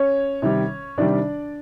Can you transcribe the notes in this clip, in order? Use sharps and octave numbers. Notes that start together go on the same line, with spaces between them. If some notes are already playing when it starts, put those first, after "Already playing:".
Already playing: C#4 C#5
C3 D#3 G3
C3 D#3 G3 D4 D5